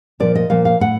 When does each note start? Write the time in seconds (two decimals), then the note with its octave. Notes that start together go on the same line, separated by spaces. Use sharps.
0.20 A#2 F3 D5
0.35 D#5
0.50 A#2 F3 F5
0.65 F5
0.80 A2 F#5